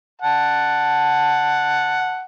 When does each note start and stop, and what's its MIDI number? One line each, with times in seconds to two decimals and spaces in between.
0.22 2.22 78
0.22 2.22 81